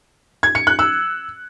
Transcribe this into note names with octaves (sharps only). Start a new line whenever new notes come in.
G#6
C#7
F#6
E6